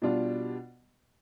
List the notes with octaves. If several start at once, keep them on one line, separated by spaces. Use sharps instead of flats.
B2 G3 D4 F4